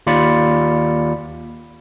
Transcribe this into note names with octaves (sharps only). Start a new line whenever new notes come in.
D#2 F4 D5 B5 C#7